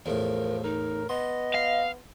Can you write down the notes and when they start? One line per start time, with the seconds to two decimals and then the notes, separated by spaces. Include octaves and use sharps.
0.06 E2 A2 F3 A#4
0.64 D#4 A#4
1.09 B3 D#5 C6
1.55 F5